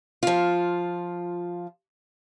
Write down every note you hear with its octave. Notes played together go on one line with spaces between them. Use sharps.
F3 F4